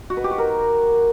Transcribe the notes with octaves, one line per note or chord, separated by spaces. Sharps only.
F#4
B4
G4
F#4
A#4